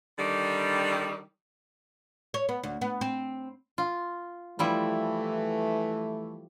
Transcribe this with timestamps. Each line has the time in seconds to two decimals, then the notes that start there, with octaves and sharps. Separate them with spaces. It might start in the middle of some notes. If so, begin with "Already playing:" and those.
0.18 D3 D#3 G3
2.34 C#5
2.49 B3
2.63 D2
2.81 B3
3.01 C4
3.78 F4
4.59 E3 F3 G3 A3 E4